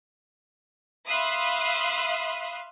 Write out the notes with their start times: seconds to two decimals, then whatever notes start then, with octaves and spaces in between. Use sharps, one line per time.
1.07 E5 F5 B5 C6 D#6 F#6